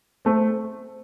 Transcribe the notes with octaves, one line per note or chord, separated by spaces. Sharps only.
A3 C4